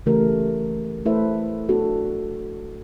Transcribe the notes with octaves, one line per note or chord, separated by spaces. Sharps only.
C#3 E3 A3 G4 A#4
A3 E4 A4 B4 C5 E5
B3 D4 F#4 A4